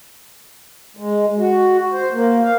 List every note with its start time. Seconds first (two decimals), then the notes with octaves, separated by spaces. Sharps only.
0.97 G#3
1.38 F#4
1.92 C5
2.13 A#3
2.44 F5